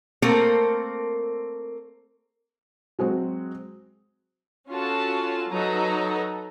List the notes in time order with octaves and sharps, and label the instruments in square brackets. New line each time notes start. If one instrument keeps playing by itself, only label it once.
[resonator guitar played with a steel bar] A3 A#3 C4 A4 A#4
[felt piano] F#3 G#3 C4 F#4
[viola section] C#4 F4 F#4 A4 A5
F#3 D#4 A4 B4 A#5